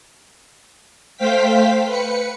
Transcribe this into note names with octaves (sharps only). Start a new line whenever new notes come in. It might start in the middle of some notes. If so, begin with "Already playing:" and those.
A3 C5 F5 G5 B6
B4 C#7